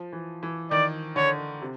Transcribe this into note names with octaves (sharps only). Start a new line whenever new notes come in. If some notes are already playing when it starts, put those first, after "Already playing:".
Already playing: F3
E3
E3
D#3 D5
D3 C#5
C3